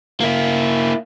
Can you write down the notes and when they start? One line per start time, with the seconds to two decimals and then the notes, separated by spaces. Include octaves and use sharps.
0.20 A#3 E4